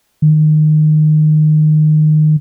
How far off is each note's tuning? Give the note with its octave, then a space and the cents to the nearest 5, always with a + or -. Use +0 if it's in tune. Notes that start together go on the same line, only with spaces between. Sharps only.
D#3 -20